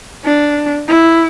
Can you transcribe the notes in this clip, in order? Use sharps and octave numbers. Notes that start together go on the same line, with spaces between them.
D4
E4